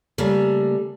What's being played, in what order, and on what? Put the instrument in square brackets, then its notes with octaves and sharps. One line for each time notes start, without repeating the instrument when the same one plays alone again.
[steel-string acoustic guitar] C#3 G3 A3 A#3